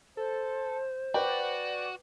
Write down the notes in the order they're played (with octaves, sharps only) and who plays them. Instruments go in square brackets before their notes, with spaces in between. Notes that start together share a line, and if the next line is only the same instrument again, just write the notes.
[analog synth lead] A4 [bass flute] C5
[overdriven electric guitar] F#4 [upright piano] B4 G5 [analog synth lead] D5